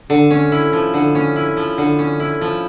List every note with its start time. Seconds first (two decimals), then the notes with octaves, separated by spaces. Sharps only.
0.10 D3
0.31 C#4
0.52 E4
0.73 F3
0.94 D3
1.15 C#4
1.36 E4
1.57 F3
1.78 D3
1.99 C#4
2.20 E4
2.41 F3